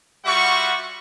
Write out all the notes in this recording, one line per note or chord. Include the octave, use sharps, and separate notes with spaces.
G3 F4 F#4 E5 F#5 C#6